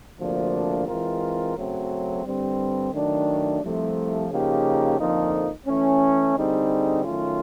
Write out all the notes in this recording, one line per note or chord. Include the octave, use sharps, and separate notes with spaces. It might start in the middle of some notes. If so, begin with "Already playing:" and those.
D2 C3 F3 A#3 D4
E3 G#3 C4 F4 A#4
F#2 C#3 F#3 A3 C4
G2 D3 G3 C4
D#3 F#3 A3 D4
C2 C3 F3 A3
C#3 F3 A#3 D#4 G4
F2 D3 F3 A#3 D#4
E3 A3 C#4
D3 G3 C4 D#4 G#4
D#3 F#3 A3 C#4 F4